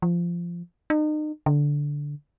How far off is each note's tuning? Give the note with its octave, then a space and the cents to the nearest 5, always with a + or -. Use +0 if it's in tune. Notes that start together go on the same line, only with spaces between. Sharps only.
F3 -15
D#4 -35
D3 -10